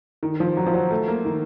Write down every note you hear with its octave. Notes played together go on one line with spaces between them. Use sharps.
D#3
F3
F#3
F3
F#3
A3
A#3
D#3